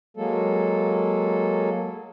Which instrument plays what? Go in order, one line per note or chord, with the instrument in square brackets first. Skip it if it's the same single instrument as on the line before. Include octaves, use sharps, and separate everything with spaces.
[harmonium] F#3 G#3 A#3 A4